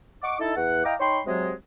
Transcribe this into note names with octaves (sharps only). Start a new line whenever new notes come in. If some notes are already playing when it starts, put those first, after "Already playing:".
D#5 F#5 C#6 D6
D#4 E4 A4
E2 F#5
E4 D#5 F5 G5 A#5 D6
D#4 C#5 G5 B5 C6
C3 F#3 G#3